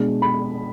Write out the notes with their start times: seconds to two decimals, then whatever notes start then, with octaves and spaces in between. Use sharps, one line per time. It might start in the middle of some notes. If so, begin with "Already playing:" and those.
Already playing: B2 G#3 D4
0.22 B5